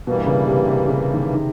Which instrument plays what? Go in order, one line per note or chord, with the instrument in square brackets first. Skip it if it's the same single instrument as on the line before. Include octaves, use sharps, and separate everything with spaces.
[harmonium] G2 E3 G3 A#3 [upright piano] B2
[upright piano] C#3
C3
C3
C#3
D#3
D#3